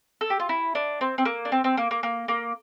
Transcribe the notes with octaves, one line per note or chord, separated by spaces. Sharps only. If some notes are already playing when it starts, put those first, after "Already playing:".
A4
G4
F4
E4
D4
C4
C4
A#3
D4
C4
C4
A#3
A#3
A#3
A#3